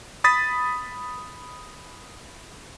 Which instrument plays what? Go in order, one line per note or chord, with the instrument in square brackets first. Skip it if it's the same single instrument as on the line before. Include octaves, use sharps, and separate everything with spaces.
[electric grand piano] B5 D#6 A6 B6